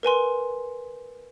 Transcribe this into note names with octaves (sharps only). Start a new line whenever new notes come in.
A#4 B4 G#5 C6